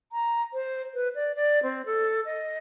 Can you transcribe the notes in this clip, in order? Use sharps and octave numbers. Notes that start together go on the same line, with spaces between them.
A#5
C5
B4
D5
D5
C4
A4
D#5